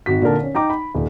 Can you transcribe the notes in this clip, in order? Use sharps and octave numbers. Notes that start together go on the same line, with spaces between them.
G#1 F#4 B6
A#2 D3 A#4 A5
C#4
D#4 G5 A#5 D6
B5
D#1